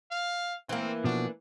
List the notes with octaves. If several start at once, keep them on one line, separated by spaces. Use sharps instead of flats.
F5
E3 A#3 C4
B2 F3 D4 F#4